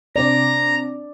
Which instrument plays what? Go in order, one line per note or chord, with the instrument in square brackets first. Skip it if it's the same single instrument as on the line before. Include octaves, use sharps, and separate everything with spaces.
[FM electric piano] C3 C4 D4 [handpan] D5 [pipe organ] A#5